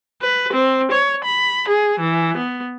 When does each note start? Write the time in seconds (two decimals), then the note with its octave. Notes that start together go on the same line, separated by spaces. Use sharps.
0.22 B4
0.53 C4
0.91 C#5
1.24 B5
1.68 G#4
2.00 E3
2.37 B3